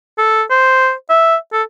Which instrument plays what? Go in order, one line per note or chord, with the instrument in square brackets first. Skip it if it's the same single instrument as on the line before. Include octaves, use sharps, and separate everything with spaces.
[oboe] A4
C5
E5
A4